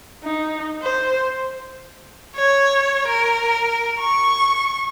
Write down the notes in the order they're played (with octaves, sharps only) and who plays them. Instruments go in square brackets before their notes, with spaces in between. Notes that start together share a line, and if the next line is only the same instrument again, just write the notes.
[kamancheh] D#4
C5
[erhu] C#5
A#4
C#6